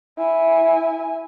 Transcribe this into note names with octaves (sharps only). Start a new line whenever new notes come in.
E4 G#5